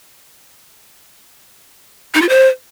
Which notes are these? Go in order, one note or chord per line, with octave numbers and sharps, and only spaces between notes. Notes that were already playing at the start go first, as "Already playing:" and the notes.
D#4
F4
C5